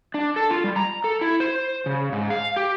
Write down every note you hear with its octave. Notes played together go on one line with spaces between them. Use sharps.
D4
A4
F4
G3
A#5
A4
E4
C5
C#3
G#2
F5
G4